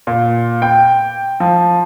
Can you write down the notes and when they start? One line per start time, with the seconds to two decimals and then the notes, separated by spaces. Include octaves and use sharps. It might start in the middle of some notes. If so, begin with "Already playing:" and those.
0.07 A#2
0.62 G5
1.40 F3